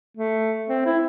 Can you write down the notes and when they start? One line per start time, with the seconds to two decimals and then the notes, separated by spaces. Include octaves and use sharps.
0.17 A3
0.69 C4
0.86 E4